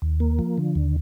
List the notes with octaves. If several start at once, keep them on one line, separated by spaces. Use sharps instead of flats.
D#2
A#3
F3
D3
D#2